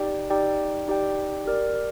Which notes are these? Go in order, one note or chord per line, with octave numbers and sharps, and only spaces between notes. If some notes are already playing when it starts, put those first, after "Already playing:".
Already playing: D#4 G4 D5 G5
D#4 G4 D5 G5
D#4 G4 D5 G5
G4 A#4 D5